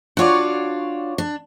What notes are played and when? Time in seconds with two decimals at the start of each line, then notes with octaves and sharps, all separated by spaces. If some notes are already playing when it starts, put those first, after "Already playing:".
0.17 D4 F4 F#4 C#5 D5
1.18 D4